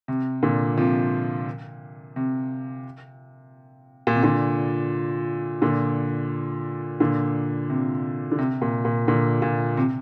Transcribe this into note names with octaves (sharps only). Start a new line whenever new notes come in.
C3
A#2 D3
C3 F3
C3
A#2
C3
A#2 D3
A#2 D3
A#2 D3
C3
D3
C3
A#2
A#2
A#2 D3
A#2
C3